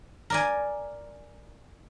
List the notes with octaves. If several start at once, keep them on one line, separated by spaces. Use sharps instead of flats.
A#4 D5 G#5